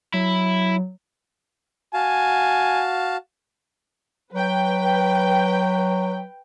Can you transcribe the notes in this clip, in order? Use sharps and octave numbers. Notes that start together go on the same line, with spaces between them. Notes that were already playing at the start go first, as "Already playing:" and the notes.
F#3 E4
F#4 F5 G#5 A5
F#3 B4 G5